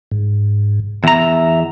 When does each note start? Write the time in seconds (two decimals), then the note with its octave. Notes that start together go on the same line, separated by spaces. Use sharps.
0.11 G#2
1.04 E2 E5 A#5